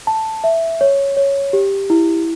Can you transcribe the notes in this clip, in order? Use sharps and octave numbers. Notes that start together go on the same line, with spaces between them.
A5
E5
C#5
C#5
G4
E4